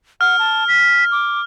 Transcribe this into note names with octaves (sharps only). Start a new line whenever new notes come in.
F#5 F6
A5
B6
D6